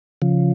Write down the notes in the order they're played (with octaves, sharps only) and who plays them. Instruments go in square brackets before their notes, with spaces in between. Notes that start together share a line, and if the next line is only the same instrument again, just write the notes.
[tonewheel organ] C#3 F3